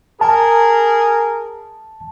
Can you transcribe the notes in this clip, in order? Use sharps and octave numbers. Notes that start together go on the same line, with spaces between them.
G#4 A#4 A5